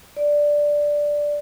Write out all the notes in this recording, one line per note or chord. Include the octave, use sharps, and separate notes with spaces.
D5